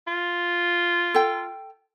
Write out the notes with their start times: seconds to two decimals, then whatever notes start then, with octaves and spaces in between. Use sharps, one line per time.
0.07 F4
1.14 A4 G5